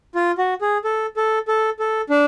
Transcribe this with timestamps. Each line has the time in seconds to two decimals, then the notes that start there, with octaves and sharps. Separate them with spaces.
0.15 F4
0.38 F#4
0.61 G#4
0.84 A4
1.17 A4
1.48 A4
1.79 A4
2.10 D4